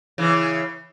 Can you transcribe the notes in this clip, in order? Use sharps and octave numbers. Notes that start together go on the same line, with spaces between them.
C#3 E3